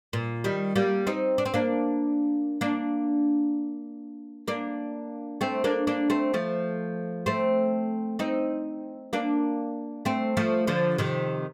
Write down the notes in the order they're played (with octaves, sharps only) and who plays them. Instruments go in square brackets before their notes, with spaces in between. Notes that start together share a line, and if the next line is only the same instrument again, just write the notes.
[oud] A#2
D#3 G3
G3 A#3
C4 D#4
D4
C4
A#3 D4
A#3 D4
A#3 D4
A3 C4
A#3 D4
A#3 D4
A3 C4
F3 A3
A3 C4
C4 D#4
A#3 D4
A3 C4
F3 A3
D3 F3
C3 D#3